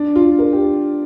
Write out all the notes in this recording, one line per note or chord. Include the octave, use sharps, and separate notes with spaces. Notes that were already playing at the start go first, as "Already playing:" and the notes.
Already playing: D4
F4
A#4
G4